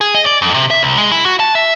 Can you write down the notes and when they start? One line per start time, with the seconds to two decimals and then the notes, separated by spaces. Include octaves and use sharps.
0.01 G#4
0.15 D#5
0.26 D5
0.42 F2
0.54 C3
0.70 E5
0.83 C2
0.97 G#3
1.11 E4
1.25 F#4
1.40 A5
1.55 E5